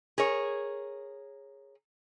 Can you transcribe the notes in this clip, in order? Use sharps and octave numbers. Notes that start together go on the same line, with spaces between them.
G#4 A#4 C#5